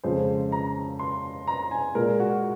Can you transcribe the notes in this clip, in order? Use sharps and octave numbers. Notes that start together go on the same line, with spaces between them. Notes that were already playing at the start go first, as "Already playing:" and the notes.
F2 C#3 G#3 C5
A#5
C6
A#5
G#5
A#2 G#3 A#4
F#4